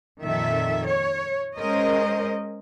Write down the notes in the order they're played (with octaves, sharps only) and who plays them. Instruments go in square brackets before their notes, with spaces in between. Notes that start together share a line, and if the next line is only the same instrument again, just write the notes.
[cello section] F2 A#2 D#3 A4 E5
C#5
G#3 C#4 A#4 C5 D#5